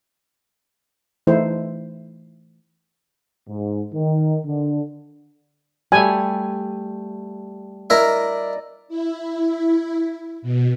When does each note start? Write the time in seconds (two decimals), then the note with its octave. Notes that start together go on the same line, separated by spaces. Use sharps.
1.27 E3 A3 D#4 E4 C5
3.48 G#2
3.93 D#3
4.45 D3
5.92 G3 A3 G#5
7.90 E4 A#4 D5 D#5 A#5
8.88 E4
10.42 B2